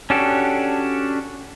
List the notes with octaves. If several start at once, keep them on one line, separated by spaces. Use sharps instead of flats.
C#4 D4 F#4 G4 A4